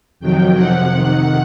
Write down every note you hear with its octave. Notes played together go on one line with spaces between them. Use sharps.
F2 C3 D#3 F#3 G5
F2 C3 F3 F#5
F2 C3 D#3 F#5